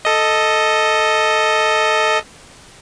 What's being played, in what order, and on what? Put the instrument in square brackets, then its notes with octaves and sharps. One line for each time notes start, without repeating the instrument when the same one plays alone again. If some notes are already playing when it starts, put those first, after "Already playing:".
[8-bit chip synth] A4 D#5